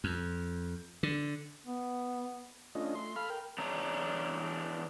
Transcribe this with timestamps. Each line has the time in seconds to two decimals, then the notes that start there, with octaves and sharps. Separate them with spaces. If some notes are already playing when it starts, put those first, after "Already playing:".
0.04 F2
1.03 D3
1.65 B3
2.75 A3 C#4 D4 F4 D#5
2.95 A3 C6
3.16 A4 F5 B5 F6
3.30 A#4 G5
3.58 E2 D4 C#5 A#5